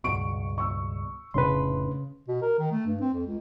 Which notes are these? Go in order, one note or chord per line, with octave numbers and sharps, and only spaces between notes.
C#2 G2 B2 C#6 D7
C#6 E6
F1 A2 C#3 D4 B4 C6
B2
A#4
D#3
A3
G2
C4
F2
C#2